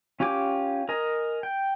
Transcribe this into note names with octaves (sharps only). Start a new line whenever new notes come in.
C#4 F4 G4 G#5 D6
A#4 D#5 G#5
G5